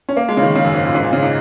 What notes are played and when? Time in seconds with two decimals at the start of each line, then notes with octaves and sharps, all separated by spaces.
0.09 C#4
0.17 A#3
0.29 G#3
0.37 C#3
0.43 D#3
0.56 C#3
0.64 F#2
0.74 G#2
0.84 A#2
0.95 G#2
1.03 A#2
1.13 C#3
1.23 D#4